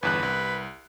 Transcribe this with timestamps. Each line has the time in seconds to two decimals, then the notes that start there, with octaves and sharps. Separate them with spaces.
0.03 G1 E2 B4 F#6
0.23 C2